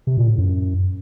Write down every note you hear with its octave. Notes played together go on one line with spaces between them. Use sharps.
C3
A#2
A2
F#2